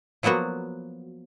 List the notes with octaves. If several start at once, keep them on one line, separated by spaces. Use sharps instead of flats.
F3 F#3 A#3 B3 F#4